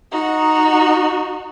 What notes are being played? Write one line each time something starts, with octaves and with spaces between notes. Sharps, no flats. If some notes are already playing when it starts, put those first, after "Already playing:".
D#4 F#4